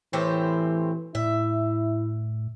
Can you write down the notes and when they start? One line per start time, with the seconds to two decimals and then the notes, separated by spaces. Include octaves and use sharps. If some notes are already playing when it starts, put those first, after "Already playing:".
0.13 A2 E3 C4 G4
1.15 A2 E4 E5